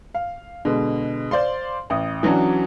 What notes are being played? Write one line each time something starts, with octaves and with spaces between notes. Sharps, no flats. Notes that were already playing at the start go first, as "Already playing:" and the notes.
F5
B2 D3 G#3
C5 D5 F5 C6
A1 D#6
E3 F#3 C#4 D4 F#4